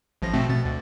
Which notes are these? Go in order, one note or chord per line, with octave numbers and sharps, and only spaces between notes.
A1 F3 A#6
B2 A3 C4
B2 A6
D2